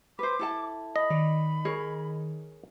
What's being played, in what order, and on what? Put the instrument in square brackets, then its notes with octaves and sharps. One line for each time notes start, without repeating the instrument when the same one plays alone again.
[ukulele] B4 C5 [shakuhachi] D6
[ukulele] E4 A4 A5
[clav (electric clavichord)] D#5 [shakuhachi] B5
[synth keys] D#3 [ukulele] D5
[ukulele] G#4 A#4 C#5